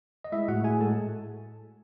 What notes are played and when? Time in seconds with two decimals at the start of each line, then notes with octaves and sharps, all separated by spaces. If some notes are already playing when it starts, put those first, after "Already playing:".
0.24 D#5
0.32 G#3 E4 E5
0.48 A2 F#4 F#5
0.64 A2 G#4 G#5
0.80 G#3 A4 A5